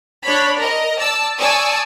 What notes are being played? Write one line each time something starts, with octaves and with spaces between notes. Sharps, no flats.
D4 C#5 B5
A#4 D#5
D5 A5 E6
D5 G#5 A5 C#6 D#6 E6